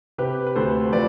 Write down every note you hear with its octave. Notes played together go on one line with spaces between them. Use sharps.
C3 G4 B4
B4
D2 A4 C5
F3 B4 D5